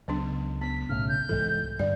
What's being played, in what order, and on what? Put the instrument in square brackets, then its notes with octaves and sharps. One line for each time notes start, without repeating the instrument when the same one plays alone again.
[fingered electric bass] C#2 [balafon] F#3 B3 D4
[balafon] B3 [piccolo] B6
[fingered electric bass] B1 A2 C#3 [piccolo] F6
[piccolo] G6
[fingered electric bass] C2 G#2 E3 [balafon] A4
[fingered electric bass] G2 D3 [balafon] D5